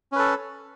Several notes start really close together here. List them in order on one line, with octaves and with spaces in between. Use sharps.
C#4 B4 A4